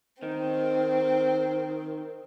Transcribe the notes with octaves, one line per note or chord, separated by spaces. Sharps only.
D#3 C4